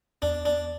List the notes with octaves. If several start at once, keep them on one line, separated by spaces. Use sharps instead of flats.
E2 D4
D4